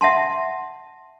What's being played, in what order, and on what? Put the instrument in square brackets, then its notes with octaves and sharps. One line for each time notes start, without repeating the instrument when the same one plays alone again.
[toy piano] E5 F#5 A5 C6